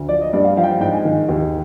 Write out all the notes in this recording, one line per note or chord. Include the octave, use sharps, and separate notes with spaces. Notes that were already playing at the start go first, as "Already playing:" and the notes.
Already playing: D2
F3 D5
D#5
G2 D5
F5
F3 F5
G5
F5
G#2 G5
G#5
D#3
D#2